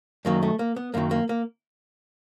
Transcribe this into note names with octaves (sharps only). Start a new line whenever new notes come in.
F#2 D#3 F#3 A#3
A3
A#3
B3
F#2 D#3 F#3 A#3
A#3
A#3